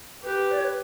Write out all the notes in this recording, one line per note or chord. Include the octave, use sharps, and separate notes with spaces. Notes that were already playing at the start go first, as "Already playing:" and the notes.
G4 B4
D5
C#5
B4